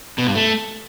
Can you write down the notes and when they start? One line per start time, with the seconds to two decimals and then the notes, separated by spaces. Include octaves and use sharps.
0.18 B2
0.27 G2
0.35 A3